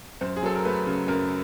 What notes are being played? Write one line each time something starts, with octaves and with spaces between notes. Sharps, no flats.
F#2 C5
G#4
F#3 A4
A#4
A3 B4
C#3
F#2 A#4